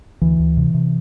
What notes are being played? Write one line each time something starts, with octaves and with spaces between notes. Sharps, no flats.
D2 E3
D2
C3
C3